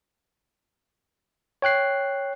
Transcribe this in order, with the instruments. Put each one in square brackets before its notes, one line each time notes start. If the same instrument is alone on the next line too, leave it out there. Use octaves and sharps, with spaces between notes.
[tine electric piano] C#5 G5 F#6 C7